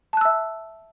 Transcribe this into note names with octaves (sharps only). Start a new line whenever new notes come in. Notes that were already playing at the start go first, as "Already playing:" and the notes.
E5 A5 E6 F#6